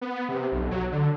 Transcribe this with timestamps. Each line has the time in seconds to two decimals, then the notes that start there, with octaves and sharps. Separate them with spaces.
0.01 B3
0.29 C3
0.52 B1
0.71 F#3
0.92 D3